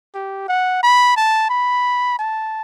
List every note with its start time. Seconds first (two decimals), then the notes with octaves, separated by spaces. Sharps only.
0.15 G4
0.49 F#5
0.83 B5
1.16 A5
1.50 B5
2.19 A5